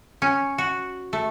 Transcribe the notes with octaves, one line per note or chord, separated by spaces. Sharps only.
C#4
F#4
A3